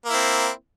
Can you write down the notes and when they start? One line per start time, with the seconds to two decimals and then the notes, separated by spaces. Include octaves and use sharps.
0.05 A#3
0.09 E4
0.13 C4